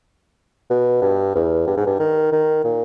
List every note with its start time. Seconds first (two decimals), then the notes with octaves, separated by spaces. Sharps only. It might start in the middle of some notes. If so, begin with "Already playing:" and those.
0.70 B2
1.02 G2
1.35 E2
1.67 G2
1.77 G#2
1.87 G2
1.99 D#3
2.32 D#3
2.64 A#2